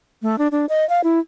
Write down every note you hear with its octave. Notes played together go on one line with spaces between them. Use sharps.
A3
D4
D4
D#5
F5
E4